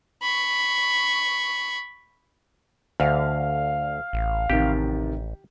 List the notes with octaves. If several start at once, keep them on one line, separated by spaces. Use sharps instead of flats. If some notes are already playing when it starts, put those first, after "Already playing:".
B5 C#6
D2 D3 F5 F6
A1
A1 C3 D#3 G4